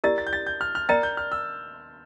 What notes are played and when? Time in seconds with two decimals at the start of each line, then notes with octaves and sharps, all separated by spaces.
0.04 E4 G4 A#4 D5 A6
0.18 A6
0.27 G6
0.33 A6
0.47 G6
0.61 F6
0.75 F6
0.89 A#4 D5 G5 A#5 A6
1.03 G6
1.17 F6
1.32 E6